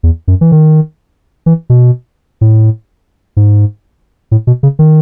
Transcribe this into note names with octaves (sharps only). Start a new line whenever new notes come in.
E2
F#2
E3
D#3
E3
B2
A2
G#2
A2
B2
C#3
D#3